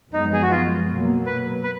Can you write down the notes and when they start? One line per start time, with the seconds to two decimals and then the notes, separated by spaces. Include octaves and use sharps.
0.13 F#2 F3 G#3 B3 D#4
0.33 G#4
0.42 F#4
0.51 F4
0.89 B2 F#3 A#3
1.26 B4
1.63 B4